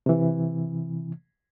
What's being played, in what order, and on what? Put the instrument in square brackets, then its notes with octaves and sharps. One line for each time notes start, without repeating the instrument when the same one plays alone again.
[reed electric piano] C3 E3